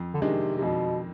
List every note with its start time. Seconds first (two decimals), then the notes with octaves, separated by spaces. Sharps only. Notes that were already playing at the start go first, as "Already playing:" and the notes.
Already playing: F2
0.14 D3
0.21 C3 D#3 G#3 D4
0.57 C3
0.62 F2 B2